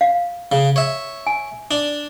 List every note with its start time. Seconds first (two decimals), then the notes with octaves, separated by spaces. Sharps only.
0.01 F5
0.52 C#3
0.76 C#5 E5
1.27 G#5
1.71 D4